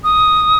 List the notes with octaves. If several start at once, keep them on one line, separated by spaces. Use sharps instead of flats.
D#6